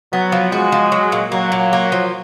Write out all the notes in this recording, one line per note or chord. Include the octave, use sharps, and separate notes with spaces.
F#3 B3
F3
G#3 F#4
F3
F#3
A#2
F#3 A#3
A#2
A#3
F3